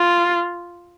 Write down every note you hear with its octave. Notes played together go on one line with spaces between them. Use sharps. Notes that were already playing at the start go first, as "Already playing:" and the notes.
Already playing: F4